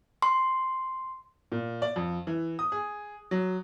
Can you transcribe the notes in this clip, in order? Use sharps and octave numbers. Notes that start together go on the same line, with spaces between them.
C6
A#2
D5
F2
E3
D#6
G#4
F#3